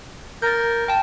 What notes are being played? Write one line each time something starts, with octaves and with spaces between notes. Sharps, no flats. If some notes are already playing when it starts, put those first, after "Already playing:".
A#4 G6 A6
G5 A5